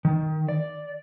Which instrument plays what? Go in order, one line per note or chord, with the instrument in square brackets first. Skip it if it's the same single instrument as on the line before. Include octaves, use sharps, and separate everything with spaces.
[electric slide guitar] D#3
D5